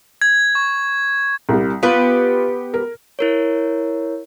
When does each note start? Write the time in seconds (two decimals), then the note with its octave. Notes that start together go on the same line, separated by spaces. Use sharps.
0.22 G#6
0.55 C#6
1.49 C2 G3
1.83 B3 F4 G4 B4
2.74 A#4
3.19 E4 A#4 C#5